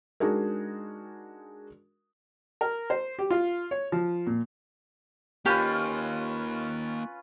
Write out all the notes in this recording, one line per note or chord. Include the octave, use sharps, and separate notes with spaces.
G#3 D4 D#4 F#4 G#4 A#4
A#4
C5
G4
F4
C#5
F3
A#2
A#3 C#4 D#4 F4 G4 B4